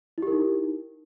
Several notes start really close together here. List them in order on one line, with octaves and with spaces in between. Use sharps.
E4 G4 A#4 D#4